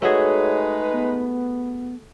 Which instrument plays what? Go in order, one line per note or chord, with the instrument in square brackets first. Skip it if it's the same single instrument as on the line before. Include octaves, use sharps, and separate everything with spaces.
[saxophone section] G#3 D#4 B4 [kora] A3 F#4 G#4 [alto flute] C#5
[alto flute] B3